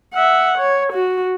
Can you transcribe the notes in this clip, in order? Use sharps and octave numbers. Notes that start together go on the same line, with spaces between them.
E5 F#5
C#5
F#4